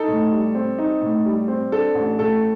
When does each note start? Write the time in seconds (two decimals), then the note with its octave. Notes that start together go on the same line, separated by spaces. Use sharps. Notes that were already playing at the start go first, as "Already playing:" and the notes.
Already playing: D#4 A4
0.08 A2
0.32 G3
0.55 C4
0.79 D#4
1.01 A2
1.25 G3
1.48 C4
1.72 D4 A4
1.95 A1
2.18 A2 A4